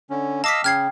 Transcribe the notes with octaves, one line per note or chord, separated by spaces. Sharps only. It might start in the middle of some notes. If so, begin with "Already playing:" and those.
D3 C#4
D#5 F5 A5 D6 E6 B6
C#3 G5 F6 G#6 C7